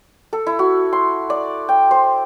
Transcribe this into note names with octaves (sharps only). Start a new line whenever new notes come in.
A4
E4
F#4
C6
D5
G5
C5